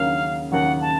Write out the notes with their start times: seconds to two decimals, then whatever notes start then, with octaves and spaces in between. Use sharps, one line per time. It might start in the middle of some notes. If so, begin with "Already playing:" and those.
Already playing: D#2 C#3 F#3 A#3 C#4 F5
0.52 D#2 C#3 F#3 A#3 C#4 F#5
0.82 A5